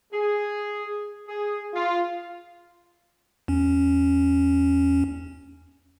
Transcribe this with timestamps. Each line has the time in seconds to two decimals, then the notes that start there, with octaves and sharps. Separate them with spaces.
0.13 G#4
1.28 G#4
1.74 F4
3.48 E2 C#4